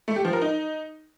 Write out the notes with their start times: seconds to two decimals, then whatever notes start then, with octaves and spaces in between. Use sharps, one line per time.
0.08 A3
0.16 G4
0.25 F3
0.33 A#4
0.41 D#4